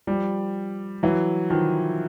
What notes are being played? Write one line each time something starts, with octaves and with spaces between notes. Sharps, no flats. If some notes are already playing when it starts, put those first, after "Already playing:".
F3 G3
E3 F#3
D#3 F3